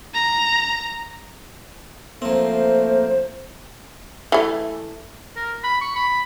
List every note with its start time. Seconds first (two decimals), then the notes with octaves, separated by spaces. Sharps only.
0.14 A#5
2.22 F3 A3 A#3 C4 C5
4.32 E3 A3
5.36 A#4
5.63 B5
5.81 C#6
5.96 B5